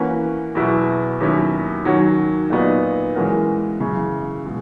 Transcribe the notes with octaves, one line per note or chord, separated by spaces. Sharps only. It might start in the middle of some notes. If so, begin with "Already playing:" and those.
Already playing: E3 A#3 C#4 F#4 B4
E2 B2 F#3 B3 E4
D#2 D#3 F#3 C#4 E4
D#3 F#3 C#4 F#4 C#5
A#2 F#3 B3 D#4
E3 G#3 C#4 F#4 A#4
F#2 C#3 E3
B2 G#3